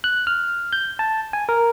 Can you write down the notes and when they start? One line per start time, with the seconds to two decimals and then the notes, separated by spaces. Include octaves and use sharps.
0.04 F#6
0.27 F6
0.73 G6
0.99 A5
1.33 G#5
1.49 A#4